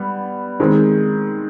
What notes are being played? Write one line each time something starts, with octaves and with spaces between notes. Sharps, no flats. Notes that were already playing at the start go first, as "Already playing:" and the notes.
Already playing: G3 B3
D#3 G#3 C4